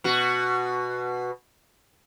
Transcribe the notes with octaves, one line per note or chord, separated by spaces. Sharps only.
B2 F#4